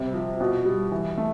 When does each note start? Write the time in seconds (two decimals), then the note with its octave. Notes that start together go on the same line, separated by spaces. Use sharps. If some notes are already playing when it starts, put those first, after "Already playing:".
Already playing: C3 G3
0.14 F3
0.41 B2
0.65 G3
0.92 E3
1.17 A3